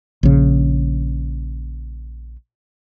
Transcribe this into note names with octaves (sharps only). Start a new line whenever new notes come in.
A#1 C#3